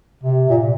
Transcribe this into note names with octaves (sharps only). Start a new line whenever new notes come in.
C3
A#2